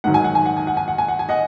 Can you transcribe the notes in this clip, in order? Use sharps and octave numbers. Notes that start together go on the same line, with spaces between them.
G#2 D#3 F#3 F#5
G#5
F#5
G#5
F#5
G#5
F#5
G#5
F#5
G#5
F#5
G#5
D#5 F#5